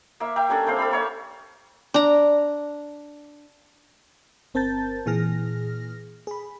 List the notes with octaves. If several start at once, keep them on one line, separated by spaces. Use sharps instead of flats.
A#3 E5
E5 G5 A#5
G3 C#4 D4 A4
A#3 C4 C5 F5
A4 E5 F5 B5
A#3 C#5 E5
D4 A#5
G1 C4 A#4 A5 G6 A6
A#2 E3 G#4 F6 A#6
G#4 B5